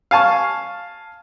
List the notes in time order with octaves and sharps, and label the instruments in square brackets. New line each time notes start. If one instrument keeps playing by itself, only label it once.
[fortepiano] F5 G#5 A5 C#6